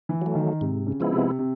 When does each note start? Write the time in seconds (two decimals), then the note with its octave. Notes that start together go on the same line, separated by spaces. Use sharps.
0.09 E3
0.22 F#3 A3
0.35 D#3
0.61 G#2 C3
0.87 C#3
1.00 F3 G#3 B3 E4
1.12 C3
1.39 C3